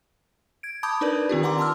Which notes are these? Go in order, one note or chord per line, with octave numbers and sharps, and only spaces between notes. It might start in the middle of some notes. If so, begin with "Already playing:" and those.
G#6 D7
A5 B5 D6 D#6 G6 G#6
D4 D#4 A#4 B4 D5
D#3 C4 F4 G4
D5 F#5 A#5 C6 D6
A5 C6 E6 F6